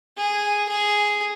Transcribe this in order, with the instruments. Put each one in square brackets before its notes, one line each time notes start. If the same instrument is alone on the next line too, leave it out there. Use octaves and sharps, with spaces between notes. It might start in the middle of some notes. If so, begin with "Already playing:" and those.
[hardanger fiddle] G#4
G#4